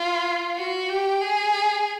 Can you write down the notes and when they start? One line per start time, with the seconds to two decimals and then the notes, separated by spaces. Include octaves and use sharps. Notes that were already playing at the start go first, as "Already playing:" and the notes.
Already playing: F4
0.57 F#4
0.89 G4
1.22 G#4